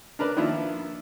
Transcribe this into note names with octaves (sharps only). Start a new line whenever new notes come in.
D4 A#4 B4 D5
D#3 F3 A#3 D4 E4 F4